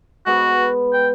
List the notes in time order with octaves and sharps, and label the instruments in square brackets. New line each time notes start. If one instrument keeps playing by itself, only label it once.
[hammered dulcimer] G#3 B3 B4 [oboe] F#4
[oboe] G5